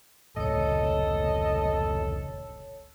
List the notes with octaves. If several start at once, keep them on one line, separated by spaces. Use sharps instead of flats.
F1 C#2 A2 A4 C#5 D#5 E6